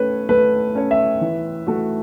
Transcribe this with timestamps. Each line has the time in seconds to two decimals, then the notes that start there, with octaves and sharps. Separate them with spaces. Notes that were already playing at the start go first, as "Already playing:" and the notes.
Already playing: A3 C#4 A4 B4 C#5
0.29 A3 B4
0.75 C#4 A4 C#5
0.91 E5
1.21 E3
1.67 A3 F#4